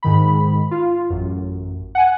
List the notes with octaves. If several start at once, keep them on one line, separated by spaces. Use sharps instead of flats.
G#2 D#3 B5
F4
A1 F#2
F#5 G#5